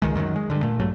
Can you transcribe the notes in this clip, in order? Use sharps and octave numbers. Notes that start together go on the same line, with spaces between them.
C#2 D#3 G#3
F#2 D#3 F3 F#3
G#3
G2 D3
A#2 A3
A#1 G2 F#3 A3